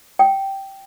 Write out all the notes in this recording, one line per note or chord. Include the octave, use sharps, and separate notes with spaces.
G5